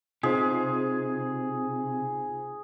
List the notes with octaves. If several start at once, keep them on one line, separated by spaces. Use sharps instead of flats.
C3 D#4 F4 G#4 C5